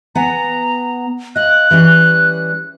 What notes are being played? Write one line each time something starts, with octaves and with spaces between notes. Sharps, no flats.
B3 F#5 G#5 A#5
D#5 F5 F#6
E3 G3 C#4